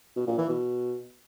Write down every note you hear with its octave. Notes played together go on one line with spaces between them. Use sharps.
B2
A#2
E3
B2